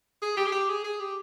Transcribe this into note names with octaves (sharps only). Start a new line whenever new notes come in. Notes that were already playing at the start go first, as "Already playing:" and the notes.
G#4
G4
G#4
G4
G#4
G#4
G4